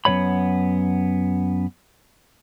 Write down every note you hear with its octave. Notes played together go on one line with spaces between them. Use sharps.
F#2 E3 B3 C#5 B5